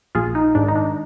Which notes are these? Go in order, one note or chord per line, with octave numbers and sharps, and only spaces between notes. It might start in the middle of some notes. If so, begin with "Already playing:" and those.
A#1 F4 G#4
D#4
G#2 D#3 D4
D#4
D4